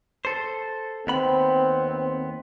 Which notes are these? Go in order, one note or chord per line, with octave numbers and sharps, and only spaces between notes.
A4 C5
D#2 B3 C4 B5